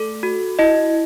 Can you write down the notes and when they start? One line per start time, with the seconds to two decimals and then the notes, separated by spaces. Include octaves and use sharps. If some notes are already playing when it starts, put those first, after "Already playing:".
Already playing: A3 A4
0.23 F#4
0.59 E4 D#5